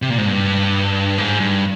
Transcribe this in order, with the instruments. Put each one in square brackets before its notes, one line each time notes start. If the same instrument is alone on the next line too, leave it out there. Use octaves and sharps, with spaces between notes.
[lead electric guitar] C3
A#2
G#2
G2
G#2
G2